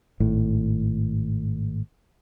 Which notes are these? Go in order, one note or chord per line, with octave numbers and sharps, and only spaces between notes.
G#1 A2